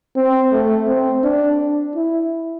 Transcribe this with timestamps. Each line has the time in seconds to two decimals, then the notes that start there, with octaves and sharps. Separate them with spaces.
0.16 C4
0.52 A3
0.87 C4
1.24 D4
1.95 E4